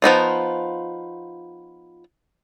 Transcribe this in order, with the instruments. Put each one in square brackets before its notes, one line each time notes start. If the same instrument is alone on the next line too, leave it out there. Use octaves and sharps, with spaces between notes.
[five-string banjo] F3 B3 D#4 F4